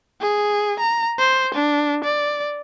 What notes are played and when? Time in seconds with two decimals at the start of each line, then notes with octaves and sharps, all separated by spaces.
0.21 G#4
0.80 A#5
1.19 C5
1.54 D4
2.04 D5